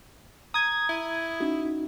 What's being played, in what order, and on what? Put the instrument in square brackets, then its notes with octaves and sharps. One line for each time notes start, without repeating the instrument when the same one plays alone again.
[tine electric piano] A#5 [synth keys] D#6 G#6
[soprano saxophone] E4
[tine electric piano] C#4 D#4 F#4